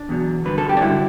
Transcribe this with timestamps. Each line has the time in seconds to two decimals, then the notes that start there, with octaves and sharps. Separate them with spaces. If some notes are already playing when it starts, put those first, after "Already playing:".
Already playing: D4
0.09 E2 B2 F#3
0.45 G2 D3 F#3 B4
0.58 A4
0.69 G4
0.77 D4
0.81 G2 D3 F#3 E4